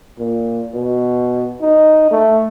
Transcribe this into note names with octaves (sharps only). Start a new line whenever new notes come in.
A#2
B2
D#4
A3